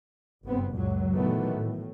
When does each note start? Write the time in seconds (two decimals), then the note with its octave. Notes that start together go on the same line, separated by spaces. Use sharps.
0.44 F#1 G2 B3 C4
0.73 C#2 F#2 A#2 F#3
1.14 A#2 D#3 E3 F#3 A3 B3
1.54 A2